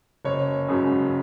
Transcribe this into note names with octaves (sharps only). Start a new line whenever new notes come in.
F#1 C#5
F#2 C#3 F#3